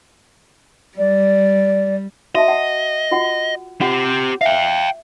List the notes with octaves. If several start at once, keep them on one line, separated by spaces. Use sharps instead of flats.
G3 D5
F#4 D#5 E5 A5
F#5 A5
F4 F#4 F#5
C4 F4 G4 F#5
E5 F5 G5